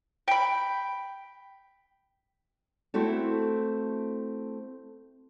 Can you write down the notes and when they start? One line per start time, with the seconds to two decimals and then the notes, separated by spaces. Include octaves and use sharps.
0.28 G5 B5
2.94 A3 C4 E4 F#4 A4